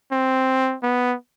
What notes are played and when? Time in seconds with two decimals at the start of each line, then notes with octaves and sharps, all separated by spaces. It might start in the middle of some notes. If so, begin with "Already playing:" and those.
0.12 C4
0.83 B3